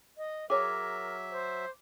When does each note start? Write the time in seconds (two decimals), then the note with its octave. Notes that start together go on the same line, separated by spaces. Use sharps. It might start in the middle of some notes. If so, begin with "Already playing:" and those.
0.17 D#5
0.50 F#3 G#4 A#4 C#5 E5 D6
1.31 C5